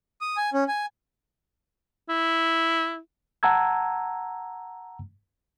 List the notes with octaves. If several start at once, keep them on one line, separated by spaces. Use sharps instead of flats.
D#6
G#5
C#4
G#5
E4
F#5 A5 A#5 E6 G#6